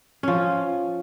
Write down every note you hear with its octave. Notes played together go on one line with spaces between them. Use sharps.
F3 C#4